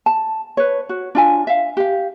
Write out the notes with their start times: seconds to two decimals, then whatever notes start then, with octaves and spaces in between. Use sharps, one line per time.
0.06 A5
0.57 B4 C#5
0.89 F#4
1.15 D4 F4 G#5
1.47 E5 F5
1.77 G4 F5